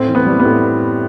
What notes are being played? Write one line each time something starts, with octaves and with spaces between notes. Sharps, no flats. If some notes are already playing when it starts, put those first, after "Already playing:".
Already playing: A2 C4
E3
B3
G3
B3
A2